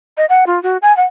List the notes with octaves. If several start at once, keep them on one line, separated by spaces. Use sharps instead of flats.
D#5
F#5
F4
F#4
G#5
F#5